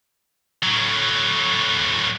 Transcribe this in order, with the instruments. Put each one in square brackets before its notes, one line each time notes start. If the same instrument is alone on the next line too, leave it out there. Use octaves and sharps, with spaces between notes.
[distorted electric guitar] A2 F#3